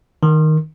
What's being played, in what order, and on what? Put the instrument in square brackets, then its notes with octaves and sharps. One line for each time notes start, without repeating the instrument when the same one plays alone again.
[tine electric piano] D#3